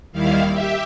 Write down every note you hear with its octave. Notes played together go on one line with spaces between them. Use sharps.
D#2 D#3 G3 E4 F5
G4 E5